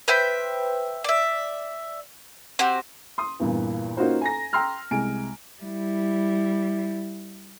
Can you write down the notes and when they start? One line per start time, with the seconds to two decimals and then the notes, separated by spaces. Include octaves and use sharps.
0.08 B4 C5 E5 G5
1.04 D5 E5
2.59 C4 F#4 G4
3.18 C6 D#6
3.40 E2 G2 A#2
3.97 A#3 C#4 D#4 F4 F#4 C5
4.21 G#5 A#5 A#6
4.53 G5 A#5 C6 E6 F6
4.91 C2 G#3 G#5 D7
5.63 G3 E4